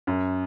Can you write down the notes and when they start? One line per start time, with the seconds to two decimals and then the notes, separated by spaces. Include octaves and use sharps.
0.07 F#2